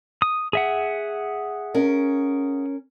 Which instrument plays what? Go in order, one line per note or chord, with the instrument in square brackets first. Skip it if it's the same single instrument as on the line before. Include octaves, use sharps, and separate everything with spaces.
[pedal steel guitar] D#6
G#4 E5 F#5
[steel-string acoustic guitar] C#4 A#4